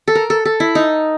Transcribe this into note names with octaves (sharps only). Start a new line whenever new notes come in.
A4
A#4
A4
A4
E4
D#4